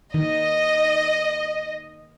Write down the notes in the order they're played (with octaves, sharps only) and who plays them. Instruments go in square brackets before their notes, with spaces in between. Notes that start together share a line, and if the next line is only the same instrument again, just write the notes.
[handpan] D#3 [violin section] D#5